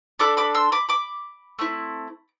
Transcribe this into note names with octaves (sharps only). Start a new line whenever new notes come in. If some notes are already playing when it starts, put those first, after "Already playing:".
D4 A4 B5 D6
B5 D6
C6 E6
B5 D6
B5 D6
A3 C4 E4